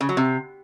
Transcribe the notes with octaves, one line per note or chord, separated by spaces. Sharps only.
C#3
F#3
C3